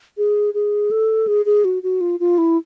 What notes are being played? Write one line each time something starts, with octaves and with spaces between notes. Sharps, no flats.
G#4
G#4
A4
G#4
G#4
F#4
F#4
F4
F4
E4